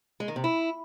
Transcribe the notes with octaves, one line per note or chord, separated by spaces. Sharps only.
G#3
D#3
C3
E4